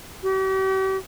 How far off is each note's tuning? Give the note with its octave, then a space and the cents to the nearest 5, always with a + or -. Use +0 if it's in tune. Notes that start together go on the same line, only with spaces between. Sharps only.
G4 -45